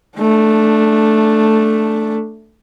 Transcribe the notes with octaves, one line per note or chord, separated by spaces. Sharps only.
A3 D4